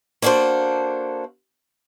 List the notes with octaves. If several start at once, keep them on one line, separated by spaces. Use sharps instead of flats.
A#3 D4 F#4 A4 C5